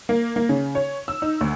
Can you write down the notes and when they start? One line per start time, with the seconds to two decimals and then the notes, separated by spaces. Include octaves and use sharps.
0.09 A#3
0.36 A#3
0.49 C#3
0.75 C#5
1.08 E6
1.22 D#4
1.41 D2